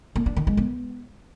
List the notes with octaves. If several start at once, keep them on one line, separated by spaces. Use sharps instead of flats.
A#3
D4
D#3
G#3
B3